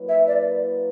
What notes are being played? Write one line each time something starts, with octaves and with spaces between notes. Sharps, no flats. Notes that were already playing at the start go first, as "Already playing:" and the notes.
Already playing: F#3 A#3 E4 B4
E5
D5